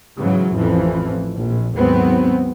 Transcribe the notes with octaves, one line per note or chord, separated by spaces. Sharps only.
G#2 C#3 E3 F#3
A1 F2 E3 F3
A#1
D#2 G#2 F#3 B3 C4